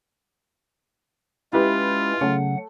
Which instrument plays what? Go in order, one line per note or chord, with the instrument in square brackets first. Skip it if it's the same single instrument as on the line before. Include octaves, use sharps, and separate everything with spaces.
[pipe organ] G#3 C#4 [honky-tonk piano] E4 G4 B4 [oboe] F4
[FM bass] C#3 [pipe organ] F#3 F#5 [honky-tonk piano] A3